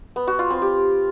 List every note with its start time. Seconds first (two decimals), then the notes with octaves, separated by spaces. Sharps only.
0.16 B3
0.27 F#4
0.39 F4
0.50 C4
0.62 G4